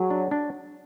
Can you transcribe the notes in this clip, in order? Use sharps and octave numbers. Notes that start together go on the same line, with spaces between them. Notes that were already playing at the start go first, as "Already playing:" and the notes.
Already playing: F#3 G#4
D4
D4